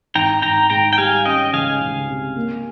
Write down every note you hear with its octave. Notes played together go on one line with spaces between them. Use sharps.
G#1 G5 A#5
G#1 G5 A#5
G#2 G5 A#5
G5
G3 F5 G#5
C#4 D#5 G5
C#2 F5 G#5
C#2
C3
A#3